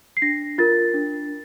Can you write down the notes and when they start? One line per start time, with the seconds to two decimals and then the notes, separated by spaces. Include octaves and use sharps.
0.17 C7
0.22 D4 A#6
0.58 F4 A#4 A6
0.94 D4